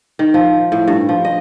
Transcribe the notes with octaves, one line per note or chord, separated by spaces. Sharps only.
D#3
F3
A2
G2
F3
D#5